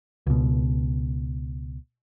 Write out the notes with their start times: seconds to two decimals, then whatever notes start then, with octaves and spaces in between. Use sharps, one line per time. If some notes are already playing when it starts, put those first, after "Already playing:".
0.27 C#2 B2